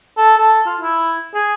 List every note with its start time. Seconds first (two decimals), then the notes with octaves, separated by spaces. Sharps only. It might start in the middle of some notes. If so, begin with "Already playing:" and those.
0.17 A4
0.38 A4
0.66 F4
0.80 E4
1.34 G#4